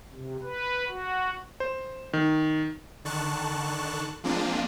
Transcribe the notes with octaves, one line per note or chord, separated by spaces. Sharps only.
C3
B4
F#4
C5
D#3
D3 D#3 A5 C#6 F#6
F3 G#3 A#3 C4 D4 F4